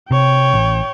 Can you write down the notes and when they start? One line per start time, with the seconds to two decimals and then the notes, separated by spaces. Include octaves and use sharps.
0.11 C3 C#5 G5
0.54 A1